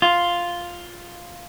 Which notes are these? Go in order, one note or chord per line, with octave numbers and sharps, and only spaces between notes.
F4